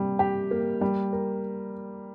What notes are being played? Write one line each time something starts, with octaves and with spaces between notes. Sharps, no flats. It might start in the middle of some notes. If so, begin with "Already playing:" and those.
Already playing: C3 G3 A#3
G4
A#3
G3
A#4